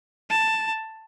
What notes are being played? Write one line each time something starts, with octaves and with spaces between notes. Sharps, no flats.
A5